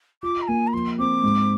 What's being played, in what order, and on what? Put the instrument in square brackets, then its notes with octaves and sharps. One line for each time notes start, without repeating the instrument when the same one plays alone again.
[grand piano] F4 [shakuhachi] D6
[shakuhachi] A#5
[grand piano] A#3 [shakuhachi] G#5
[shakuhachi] A#5
[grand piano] F3 [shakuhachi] C6
[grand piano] C4 [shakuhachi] D6
[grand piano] G#2